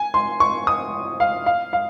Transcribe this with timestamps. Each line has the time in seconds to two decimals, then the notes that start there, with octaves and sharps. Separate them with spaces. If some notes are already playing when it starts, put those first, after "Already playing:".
Already playing: G#5
0.14 C6
0.40 C#6
0.67 D#6
1.20 F5
1.46 F5
1.73 F5